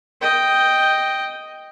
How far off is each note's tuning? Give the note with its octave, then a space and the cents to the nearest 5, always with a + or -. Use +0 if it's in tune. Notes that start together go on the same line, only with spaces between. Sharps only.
D#5 +0 G5 +0